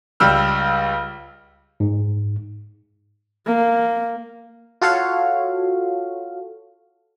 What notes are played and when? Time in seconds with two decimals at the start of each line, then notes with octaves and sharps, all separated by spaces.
0.20 C#2 G3 G4 E6 F6
1.80 G#2
3.46 A#3
4.81 F4 F#4 A4 C#5 F5